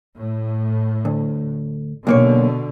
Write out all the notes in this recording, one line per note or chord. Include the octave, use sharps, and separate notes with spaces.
A2
D2
B1 B2 D3 A#3 C#5